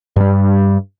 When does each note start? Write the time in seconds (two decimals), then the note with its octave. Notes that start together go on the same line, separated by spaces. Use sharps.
0.16 G2 G3